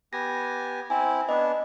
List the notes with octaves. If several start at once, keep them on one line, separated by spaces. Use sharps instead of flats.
B3 G4 G#5 A#6
C4 E4 G#5
B3 D4 D#5